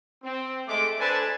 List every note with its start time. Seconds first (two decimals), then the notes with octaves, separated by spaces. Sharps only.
0.24 C4
0.67 G#3 A3 D6
0.99 D4 A4 B4 C5 G#5 A5